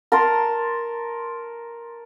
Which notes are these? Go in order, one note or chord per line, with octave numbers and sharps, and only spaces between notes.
A#4 A5 A#5 C6